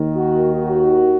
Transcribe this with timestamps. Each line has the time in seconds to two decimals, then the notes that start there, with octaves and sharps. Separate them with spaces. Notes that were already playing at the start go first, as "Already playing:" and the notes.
Already playing: D#2 D#3
0.14 F#4
0.55 F#4